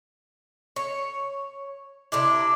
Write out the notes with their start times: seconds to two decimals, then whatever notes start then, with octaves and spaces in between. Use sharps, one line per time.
0.76 C#5
2.12 C3 D4 E4 D6